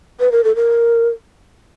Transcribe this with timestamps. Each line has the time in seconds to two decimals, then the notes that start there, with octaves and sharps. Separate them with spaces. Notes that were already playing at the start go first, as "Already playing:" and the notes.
0.20 B4
0.32 A#4
0.44 A4
0.56 A#4